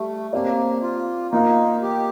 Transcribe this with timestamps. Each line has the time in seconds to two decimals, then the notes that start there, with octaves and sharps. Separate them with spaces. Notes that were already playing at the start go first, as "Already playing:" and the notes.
Already playing: G3 A3
0.33 A#3 C4 G4 D5
0.82 F4
1.32 A#3 D#4 F4 A#4 F5
1.82 G4